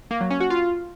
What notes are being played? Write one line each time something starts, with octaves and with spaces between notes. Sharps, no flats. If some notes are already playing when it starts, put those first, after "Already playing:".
A#3
F#3
C#4
F#4
F4